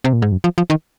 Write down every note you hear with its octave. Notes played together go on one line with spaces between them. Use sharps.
C3
A#2
G#2
F#2
F3
F3
D#3